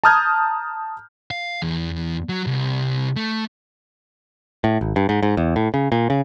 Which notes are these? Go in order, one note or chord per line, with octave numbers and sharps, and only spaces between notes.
A5 A#5 D#6 F6 G6 G#6
F5
E2
F#3
C2
A3
A2
G#1
G2
G#2
G#2
E2
A2
C#3
A#2
C#3